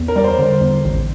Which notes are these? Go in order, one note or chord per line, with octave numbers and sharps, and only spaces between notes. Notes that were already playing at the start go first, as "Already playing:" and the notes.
Already playing: E2
A#4
G3 D5
C5
D3
E2
A1